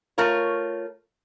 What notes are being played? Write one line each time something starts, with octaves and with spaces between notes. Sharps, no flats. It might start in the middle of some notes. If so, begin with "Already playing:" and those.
A3 F4 A#4 C#5